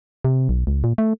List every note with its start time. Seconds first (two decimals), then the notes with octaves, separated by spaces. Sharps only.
0.25 C3
0.49 B1
0.67 C#2
0.84 A#2
0.98 A3